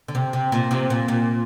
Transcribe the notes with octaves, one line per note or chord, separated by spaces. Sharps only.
D3
C3
C3
A#2
C3
A#2
A#2